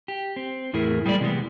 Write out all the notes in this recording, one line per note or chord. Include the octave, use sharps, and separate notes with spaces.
G4
C4
E2 A2 E4 G#4 A#4
G3 G#3 A#3 C5 D5
C3 E3 G3 G#3 B3